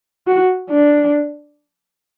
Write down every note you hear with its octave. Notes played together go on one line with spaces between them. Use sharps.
F#4
D4